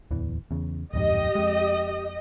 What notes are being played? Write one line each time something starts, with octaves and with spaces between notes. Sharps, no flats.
D1 E2 E3
E2 C#3
D1 F2 G#2 G4 D#5
F2 G#3